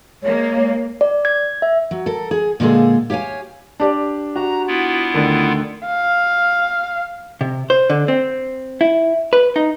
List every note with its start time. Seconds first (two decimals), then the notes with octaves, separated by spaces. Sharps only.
0.23 G#3 A#3 C#5
1.01 D5
1.25 G#6
1.62 E5
1.91 F#3
2.06 A4 A#4
2.31 G#4
2.60 A#2 D3 G#3 G#4 A4 F5
3.10 G4 C#5 F5 G5 G#5
3.80 D4 G4 D5
4.36 F#4 A#5
4.68 B3 E4 F4
5.14 D2 D3 D#3
5.86 F5
7.41 C3
7.70 C5
7.90 D3
8.08 C4
8.81 E4
9.33 B4
9.56 D#4